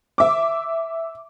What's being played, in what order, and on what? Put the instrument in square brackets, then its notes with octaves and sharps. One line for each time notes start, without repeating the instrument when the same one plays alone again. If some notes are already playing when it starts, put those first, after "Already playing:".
[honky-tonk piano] E5 D6